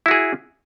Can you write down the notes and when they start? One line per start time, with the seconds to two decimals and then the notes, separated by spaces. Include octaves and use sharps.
0.06 E4
0.08 F#4
0.11 G#4